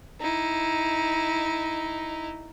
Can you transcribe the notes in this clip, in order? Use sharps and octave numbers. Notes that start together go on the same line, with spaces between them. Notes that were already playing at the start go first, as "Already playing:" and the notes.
D#4 E4